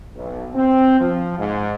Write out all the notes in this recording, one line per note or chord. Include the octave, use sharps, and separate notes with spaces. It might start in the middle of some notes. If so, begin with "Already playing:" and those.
B1
C4
F3
G#2